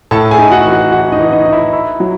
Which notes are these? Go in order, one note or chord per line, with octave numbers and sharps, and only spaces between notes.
A2 A4 A5
G#4 G#5
D#4
F#4 F#5
E3
F#4 F#5
E3 F#4 F#5
D#4 D#5
E3
D#4 D#5
D#4
E4 E5
E4
F#3